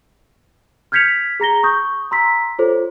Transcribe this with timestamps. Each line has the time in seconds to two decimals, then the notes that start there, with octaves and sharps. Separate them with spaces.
0.92 F6 G6 G#6 B6 C#7 F7
1.40 G#4 A#5 A#6 G7
1.63 C#6 D#6 G6
2.11 A#5 C6 E6 B6
2.59 F4 A4 C5 C#5